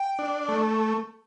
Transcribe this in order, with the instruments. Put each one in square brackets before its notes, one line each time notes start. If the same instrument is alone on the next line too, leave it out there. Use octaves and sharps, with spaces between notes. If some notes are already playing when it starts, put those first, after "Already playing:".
Already playing: [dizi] G5
[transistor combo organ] D4
A3